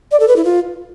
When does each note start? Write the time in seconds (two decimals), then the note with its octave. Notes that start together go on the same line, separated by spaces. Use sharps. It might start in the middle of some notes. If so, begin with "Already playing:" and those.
0.12 D5
0.20 A4
0.28 B4
0.36 E4
0.45 F4